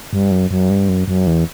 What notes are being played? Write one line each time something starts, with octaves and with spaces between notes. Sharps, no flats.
G2
F#2
F#2
G2
F#2
F#2
E2